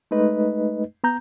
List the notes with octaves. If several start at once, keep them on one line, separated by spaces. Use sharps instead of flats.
G#3 A3 D#4 B4 D#5
B3 A#5 G6